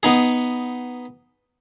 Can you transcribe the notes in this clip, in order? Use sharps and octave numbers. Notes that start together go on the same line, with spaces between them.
B3 D#4 G#4